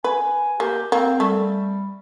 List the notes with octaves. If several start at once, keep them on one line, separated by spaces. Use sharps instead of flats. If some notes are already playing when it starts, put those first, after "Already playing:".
B4 G#5
A#3 G4
A#3 C4
G3 A3